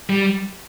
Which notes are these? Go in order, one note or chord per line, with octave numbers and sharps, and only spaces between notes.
G3